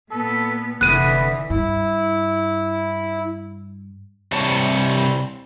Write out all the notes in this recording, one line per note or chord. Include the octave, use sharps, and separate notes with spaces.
A#2 B3 A4
F1 D3 E3 B3 F#6 D#7
G2 E4
C3 G3 C5 C#5 A5